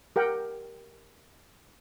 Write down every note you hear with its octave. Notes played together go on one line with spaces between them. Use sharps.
G4 A#4 F#5 G5